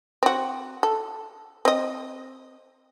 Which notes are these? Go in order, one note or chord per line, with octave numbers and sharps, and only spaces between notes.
C4 F#4
A4
C4 D#5